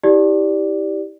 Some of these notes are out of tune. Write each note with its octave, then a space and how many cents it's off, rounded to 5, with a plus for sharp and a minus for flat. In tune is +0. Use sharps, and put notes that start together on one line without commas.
E4 -30 G4 +0 D5 +0